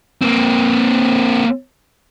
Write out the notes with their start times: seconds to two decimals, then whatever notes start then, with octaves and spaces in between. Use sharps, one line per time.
0.21 A#3 C4